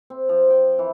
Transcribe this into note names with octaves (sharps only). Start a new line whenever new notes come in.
C4
F3
G5
E3